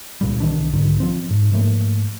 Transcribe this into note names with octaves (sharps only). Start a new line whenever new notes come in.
C#2 A#2 G3
C2 D#3 E3 D4
B1 G#2 D3 D#3
F3 C4
G#2
G#2 F3 A3 A#3